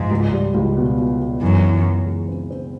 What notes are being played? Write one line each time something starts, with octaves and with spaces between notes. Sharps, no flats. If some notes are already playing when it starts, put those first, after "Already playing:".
Already playing: G#2 F3
C#2
G3
C#2
B2
B2
B2
F#2 E3
E3
E3
G#3
C4
C4